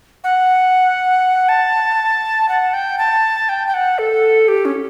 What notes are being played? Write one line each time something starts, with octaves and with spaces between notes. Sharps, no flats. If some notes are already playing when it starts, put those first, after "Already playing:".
F#5
A5
F#5
G5
A5
G5
G5
F#5
A4
G4
C#4